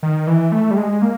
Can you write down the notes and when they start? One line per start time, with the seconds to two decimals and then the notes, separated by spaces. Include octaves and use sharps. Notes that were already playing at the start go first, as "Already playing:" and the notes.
0.03 D#3
0.27 E3
0.52 A3
0.71 G3
0.77 G#3
1.02 A#3